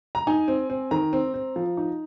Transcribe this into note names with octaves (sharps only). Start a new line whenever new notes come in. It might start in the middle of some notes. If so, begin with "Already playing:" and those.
A#5
D#4 G#5
C4
C4
D#3 A#5
C4
C4
F3
D#4